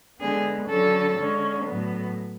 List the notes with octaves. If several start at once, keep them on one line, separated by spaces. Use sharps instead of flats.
D3 G#3 B3 G#4
D3 F#3 C#4 A4
D3 G#3 C#4
A2 F#3 B3